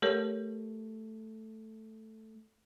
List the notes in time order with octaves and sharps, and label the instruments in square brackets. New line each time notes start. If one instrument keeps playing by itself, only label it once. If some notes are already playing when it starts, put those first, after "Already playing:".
[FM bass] A3 [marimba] G4 A#4 C#5